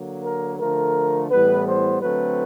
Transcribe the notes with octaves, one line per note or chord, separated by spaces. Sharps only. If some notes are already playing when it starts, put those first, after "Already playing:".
Already playing: D3 F#3 A#3
A#4
D3 F3 A3 A#4
A2 E3 G3 B3 B4
C5
D3 F#3 A3 C4 B4